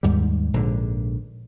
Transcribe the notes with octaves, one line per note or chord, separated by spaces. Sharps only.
D#2 G#2 G3
A#1 G#2 D3